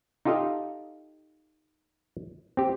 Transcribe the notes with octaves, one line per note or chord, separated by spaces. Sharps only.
D#4 F4 G4 A4 D#5 F5
C4 G4